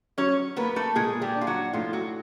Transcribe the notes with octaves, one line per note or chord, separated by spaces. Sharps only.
F#3 C#4 C#5
A#3 B3 B4
A3 A4
A#2 G#3 G#4
G3 G4
D4
F4
F#3 F#4
A2 F3 F4
F#3 F#4